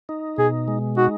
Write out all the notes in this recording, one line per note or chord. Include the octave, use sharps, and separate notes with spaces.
D#4
B2 G#4
G#3
D#4 F#4